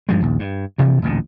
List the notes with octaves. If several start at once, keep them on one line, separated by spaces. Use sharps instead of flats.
G2 F3 G#3
A#1 D#2
G2
G2 B2 E3 F3
D1 A1 A#2 D3